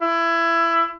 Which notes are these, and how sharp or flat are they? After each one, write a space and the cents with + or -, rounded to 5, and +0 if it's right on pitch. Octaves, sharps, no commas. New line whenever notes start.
E4 +20